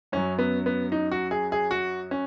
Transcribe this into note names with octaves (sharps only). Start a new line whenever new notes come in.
F#2 F#3 C#4
B3
B3
D#4
F#4
G#4
G#4
F#4
C#4